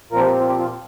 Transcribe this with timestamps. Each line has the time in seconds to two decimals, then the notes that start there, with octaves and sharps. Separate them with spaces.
0.11 A#2 F3 C4 F4 A#4
0.21 G4
0.31 G4
0.40 F4
0.49 G4
0.58 F4